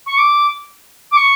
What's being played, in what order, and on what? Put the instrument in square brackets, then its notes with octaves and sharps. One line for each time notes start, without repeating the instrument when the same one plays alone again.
[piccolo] C#6
D6
D6
C#6